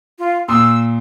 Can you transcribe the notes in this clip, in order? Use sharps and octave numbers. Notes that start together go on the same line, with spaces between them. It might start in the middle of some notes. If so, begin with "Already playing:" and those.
F4
A#2 C6 D#6 E6